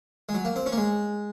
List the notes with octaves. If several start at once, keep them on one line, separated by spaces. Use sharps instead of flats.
G#3
F#3
A#3
C4
C#4
A#3
G#3